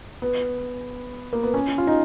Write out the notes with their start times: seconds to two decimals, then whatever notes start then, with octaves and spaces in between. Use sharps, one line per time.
0.22 B3
1.33 A#3
1.43 B3
1.54 C#4
1.78 F4
1.87 D#4